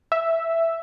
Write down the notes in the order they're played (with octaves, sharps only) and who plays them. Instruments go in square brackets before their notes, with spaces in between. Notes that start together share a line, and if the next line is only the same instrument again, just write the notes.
[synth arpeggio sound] E5